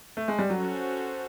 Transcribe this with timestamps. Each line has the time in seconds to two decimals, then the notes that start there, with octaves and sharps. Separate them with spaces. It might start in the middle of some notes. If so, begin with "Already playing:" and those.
0.17 A3
0.28 G#3
0.39 G3
0.50 F#3 C#4 F#4 A4 C5